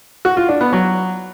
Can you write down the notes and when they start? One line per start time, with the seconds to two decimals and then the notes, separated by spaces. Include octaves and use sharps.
0.25 F#4
0.37 F4
0.49 D4
0.61 B3
0.73 F#3